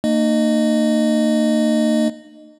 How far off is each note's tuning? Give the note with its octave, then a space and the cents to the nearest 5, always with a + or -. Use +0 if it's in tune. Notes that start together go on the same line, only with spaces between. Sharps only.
A#3 -35 D#4 -40 D#5 -15